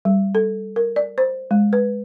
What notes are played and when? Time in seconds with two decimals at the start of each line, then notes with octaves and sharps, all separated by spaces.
0.05 G3
0.35 A4
0.76 A#4
0.96 D5
1.18 C5
1.51 G#3
1.73 B4